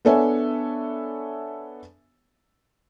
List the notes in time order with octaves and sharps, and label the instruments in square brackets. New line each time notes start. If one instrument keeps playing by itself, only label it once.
[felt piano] B3 D4 A4 C#5 E5 G#5